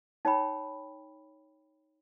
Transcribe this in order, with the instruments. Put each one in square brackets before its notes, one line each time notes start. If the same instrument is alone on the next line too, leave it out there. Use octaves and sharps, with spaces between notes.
[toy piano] D#4 C#5 G5 B5